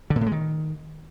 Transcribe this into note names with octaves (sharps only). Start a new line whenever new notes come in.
D3
A#2
A2
G#3
D#3